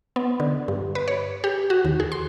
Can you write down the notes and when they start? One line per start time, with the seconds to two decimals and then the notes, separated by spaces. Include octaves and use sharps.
0.16 B3
0.40 D3
0.68 G2
0.95 B4
1.08 C#5
1.44 G4
1.70 F#4
1.85 D#2
2.00 G#4
2.12 C6